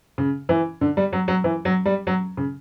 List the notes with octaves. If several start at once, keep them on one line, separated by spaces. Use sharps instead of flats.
C#3
E3
D3
G3
F#3
F#3
E3
F#3
G3
F#3
C#3